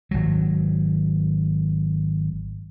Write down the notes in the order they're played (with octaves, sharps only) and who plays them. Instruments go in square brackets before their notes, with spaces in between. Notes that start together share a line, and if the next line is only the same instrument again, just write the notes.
[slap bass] G#1 F#3